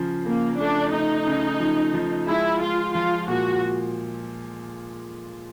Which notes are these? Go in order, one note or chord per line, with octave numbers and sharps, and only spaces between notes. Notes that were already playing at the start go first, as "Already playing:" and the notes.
Already playing: C#3 F3
C#3 A#3
A3 D4
A3 D#4
C#3
F3
F3
G#3 E4
G#3 F4
F3 F4
A#2 F#4